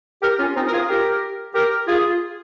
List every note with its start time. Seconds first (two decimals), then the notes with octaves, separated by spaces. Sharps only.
0.22 G4 A#4
0.39 C#4 F4
0.56 C4 D#4
0.67 A#4
0.72 F4 G#4
0.88 G4 A#4
1.54 G4 A#4
1.87 F4 G#4